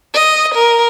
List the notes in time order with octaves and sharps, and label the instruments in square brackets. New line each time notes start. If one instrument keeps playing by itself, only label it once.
[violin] D#5
A#4